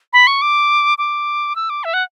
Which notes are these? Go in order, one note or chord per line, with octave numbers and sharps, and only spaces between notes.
B5
C#6
D6
D6
E6
D6
E5
F#5